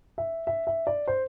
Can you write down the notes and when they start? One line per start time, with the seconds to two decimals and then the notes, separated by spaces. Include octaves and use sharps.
0.18 E5
0.47 E5
0.67 E5
0.87 D5
1.08 C5